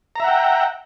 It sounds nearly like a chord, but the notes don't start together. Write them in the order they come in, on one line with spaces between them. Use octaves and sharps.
A#5 E5 F#5 G5